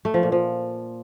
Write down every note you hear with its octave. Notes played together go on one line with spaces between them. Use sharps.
A3
F3
A#2
F3